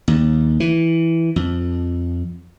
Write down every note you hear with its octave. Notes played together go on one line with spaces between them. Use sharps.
D#2
E3
F2